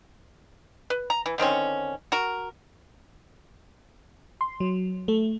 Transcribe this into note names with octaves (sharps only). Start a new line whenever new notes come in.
B4
A#5
E3
D3 D#3 C4 C#4
F#4 A#4
C6
F#3
A3